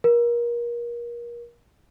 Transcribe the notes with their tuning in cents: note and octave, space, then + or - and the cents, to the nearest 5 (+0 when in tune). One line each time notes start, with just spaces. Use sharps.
A#4 +30